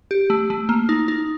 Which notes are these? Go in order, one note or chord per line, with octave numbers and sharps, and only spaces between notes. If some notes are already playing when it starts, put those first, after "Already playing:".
G4
A3
A3
A#3
D#4
D#4